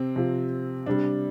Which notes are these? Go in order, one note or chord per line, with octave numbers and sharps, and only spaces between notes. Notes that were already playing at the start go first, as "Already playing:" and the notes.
Already playing: C3 C4
C3 F3
C3 G3 D4